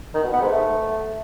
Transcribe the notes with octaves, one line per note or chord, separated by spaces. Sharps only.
D#3
B2
B3
G#2
A3